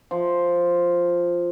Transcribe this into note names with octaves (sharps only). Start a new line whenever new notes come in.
F3